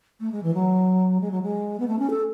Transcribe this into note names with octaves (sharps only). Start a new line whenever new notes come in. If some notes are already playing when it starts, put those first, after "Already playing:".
A3
G#3
E3
F#3
G#3
F#3
G#3
B3
A3
C#4
A4